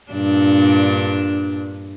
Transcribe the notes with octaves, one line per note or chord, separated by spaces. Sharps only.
G2 A#2 D4